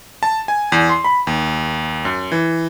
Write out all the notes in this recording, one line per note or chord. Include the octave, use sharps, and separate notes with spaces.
A5
G#5
E2
C6
B5
D#2
F#2
E3